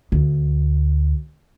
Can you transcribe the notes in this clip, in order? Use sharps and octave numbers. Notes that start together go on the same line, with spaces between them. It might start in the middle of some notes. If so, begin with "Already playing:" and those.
D2